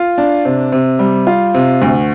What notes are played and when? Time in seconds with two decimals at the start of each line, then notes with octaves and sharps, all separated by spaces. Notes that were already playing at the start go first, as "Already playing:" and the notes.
Already playing: F4
0.18 D4
0.45 C3
0.72 C3
0.99 G3
1.27 F4
1.54 C3
1.82 D2